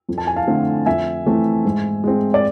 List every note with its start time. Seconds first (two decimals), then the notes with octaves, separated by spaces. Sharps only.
0.09 F2
0.18 A5
0.27 G#5
0.36 F5 A5
0.47 D3 A3 C4
0.86 F2 E5 G#5
1.26 E3 A3 C4
1.65 G#2
2.04 G#3 C4
2.34 D5